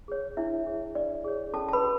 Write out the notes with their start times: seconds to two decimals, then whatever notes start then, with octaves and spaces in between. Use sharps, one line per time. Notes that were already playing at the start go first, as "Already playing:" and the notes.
0.08 G#4 C#5
0.37 D4 E4 E5
0.66 G#4 C#5
0.95 D4 D5
1.24 G#4 C#5
1.54 C#4 A4 A5
1.68 A5
1.73 B4 B5
1.83 F#4